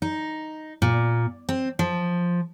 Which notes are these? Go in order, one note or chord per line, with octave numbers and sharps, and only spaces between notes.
D#4
A#2
C4
F3